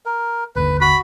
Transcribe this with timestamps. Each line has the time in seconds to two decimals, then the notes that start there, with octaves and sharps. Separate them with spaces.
0.06 A#4
0.56 G1 D#2 D3 B4
0.81 F#4 B5